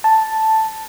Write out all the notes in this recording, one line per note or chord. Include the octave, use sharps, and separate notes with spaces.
A5